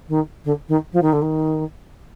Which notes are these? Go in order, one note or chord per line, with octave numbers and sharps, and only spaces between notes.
D#3
D3
D#3
F3
D#3
D3
D#3